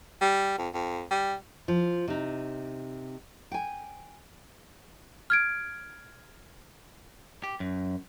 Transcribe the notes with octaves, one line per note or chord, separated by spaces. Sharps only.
G3
F2
F2
G3
F3
C3 D#4
G5 G#5
F6 G#6 D7
G4
F#2